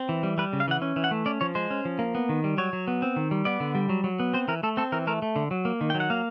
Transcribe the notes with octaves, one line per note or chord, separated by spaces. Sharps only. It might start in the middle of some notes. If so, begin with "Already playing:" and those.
Already playing: C4
E3
G3
G3 B4
C#3
F5
E3 F#5
C#4
E3
F#5
A3
C#4 D5
F3 C#5
G#3 C5
C#4
F3
A#3
B3
D#3
G3
F#3 C#5
F#3
B3
C4
D#3
G3
B3 D5
D3
G3
F#3
F#3
B3
C4 C5
E3 A#4
A3 A4
C4 A4
E3 A#4
A3 A#4
A3
D3
F#3
A#3
D#3
F#3 G5
F#5
A#3 F5